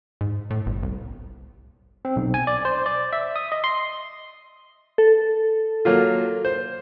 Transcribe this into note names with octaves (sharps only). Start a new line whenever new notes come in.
G#2
A2
G1
C2
C4
B1
G#5
D5
C5
D5
E5
D#6
D#5
C6
A4
F#3 A#3 F4
C5